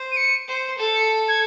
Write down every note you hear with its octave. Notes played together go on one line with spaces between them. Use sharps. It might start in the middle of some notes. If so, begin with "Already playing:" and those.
Already playing: C5
D#7
C#7
C5
A4
C#7
G#6